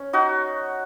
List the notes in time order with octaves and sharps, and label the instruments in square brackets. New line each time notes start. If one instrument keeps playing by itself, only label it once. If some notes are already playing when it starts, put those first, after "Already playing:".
Already playing: [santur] C#4
D#4 F#4